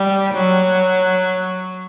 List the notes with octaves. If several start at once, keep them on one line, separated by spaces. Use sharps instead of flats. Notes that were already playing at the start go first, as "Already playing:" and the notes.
Already playing: G3
F#3